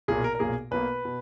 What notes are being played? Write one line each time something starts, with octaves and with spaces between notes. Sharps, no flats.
B1 A#2 A#3 G#4
A#4
A#4
B1 A#2 A#3 G#4
B1 B2 A#3 B4
B2